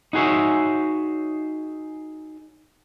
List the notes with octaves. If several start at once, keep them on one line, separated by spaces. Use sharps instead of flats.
D#4 F#4 G#4 C#5 E5